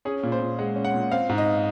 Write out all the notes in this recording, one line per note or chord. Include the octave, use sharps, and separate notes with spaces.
C#4 G#4
A#2
C5
A#2
G#3 F#5
C#4
F#5
A#2
C4 F5
G#2
D#5